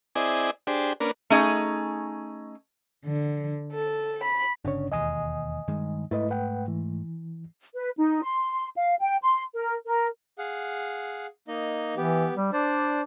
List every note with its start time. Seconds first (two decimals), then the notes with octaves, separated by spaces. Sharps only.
0.16 C4 E4 G#4 D5 D#5 G#5
0.67 D4 G4 G#4 C5
1.00 A#3 C#4 D4 A#4 B4
1.30 A3 C#4 D#4 G#4 D#5
3.05 D3
3.73 A4
4.24 B5
4.65 G1 C#3 D4 C#5
4.92 E1 D#2 D#5 G#5 D#6
5.68 G2 D#3 G#3
6.11 G#2 A3 E4 B4 D#5
6.30 B4 F#5 G5
6.68 E3
7.75 B4
7.98 D#4
8.22 C6
8.76 F5
9.00 G5
9.22 C6
9.54 A#4
9.86 A#4
10.38 G#4 F5 F#5
11.48 A#3 D#4 D#5
11.97 E3 B3 G4
12.36 G3
12.53 D4 C5 D5